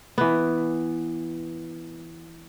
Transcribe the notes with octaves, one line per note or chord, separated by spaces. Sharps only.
E3 B3